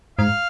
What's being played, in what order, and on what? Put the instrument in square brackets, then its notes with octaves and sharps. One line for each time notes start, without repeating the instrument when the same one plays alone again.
[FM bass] G#2 [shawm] F5